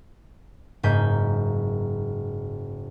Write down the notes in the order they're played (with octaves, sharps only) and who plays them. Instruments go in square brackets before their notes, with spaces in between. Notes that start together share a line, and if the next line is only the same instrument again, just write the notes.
[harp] F#1 G#2 A#3 G#5 G6 B6